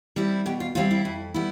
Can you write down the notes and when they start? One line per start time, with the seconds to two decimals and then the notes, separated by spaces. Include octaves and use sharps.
0.16 G3 C4 E4
0.46 B2 G4
0.60 F4
0.75 G3 C4 E4 F4
0.91 E4
1.05 F2
1.34 G3 B3 E4